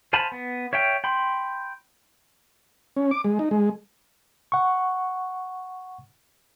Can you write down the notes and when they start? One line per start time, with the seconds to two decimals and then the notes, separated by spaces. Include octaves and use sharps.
0.13 C5 F5 G#5 A5 B5
0.32 B3
0.73 C#5 E5 F5 G5
1.04 G5 B5 C6
2.96 C#4
3.11 D6
3.24 G#3
3.39 D#4
3.51 G#3
4.52 F#5 C#6